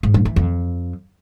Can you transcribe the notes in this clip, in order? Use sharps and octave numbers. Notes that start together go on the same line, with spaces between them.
G#2
G2
E3
F2